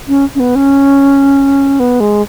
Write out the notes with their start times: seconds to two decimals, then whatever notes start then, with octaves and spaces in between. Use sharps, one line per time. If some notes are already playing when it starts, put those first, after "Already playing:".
0.08 C#4
0.35 C#4
0.40 B3
0.55 C#4
1.80 B3
2.00 G#3